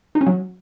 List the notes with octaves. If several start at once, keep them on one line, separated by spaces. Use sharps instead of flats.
D#4
C#4
F#3